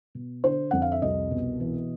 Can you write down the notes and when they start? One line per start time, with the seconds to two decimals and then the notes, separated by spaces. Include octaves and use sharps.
0.15 B2
0.44 D3 C5
0.71 F2 F#5
0.82 F5
0.92 E5
1.02 C2 D#5
1.31 B2
1.60 E3